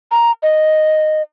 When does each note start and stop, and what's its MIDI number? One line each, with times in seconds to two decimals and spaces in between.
0.11 0.31 82
0.43 1.22 75